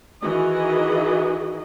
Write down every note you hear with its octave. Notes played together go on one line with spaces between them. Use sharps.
D#3 E3 F#4 G#4 D#5